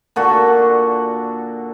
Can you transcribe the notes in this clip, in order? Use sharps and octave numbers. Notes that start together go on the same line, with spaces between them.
A#2 D3 F#4 C#6